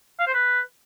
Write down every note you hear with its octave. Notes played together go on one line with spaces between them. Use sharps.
F5
C5
B4